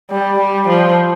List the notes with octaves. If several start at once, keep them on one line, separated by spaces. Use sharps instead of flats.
G3
G3
F3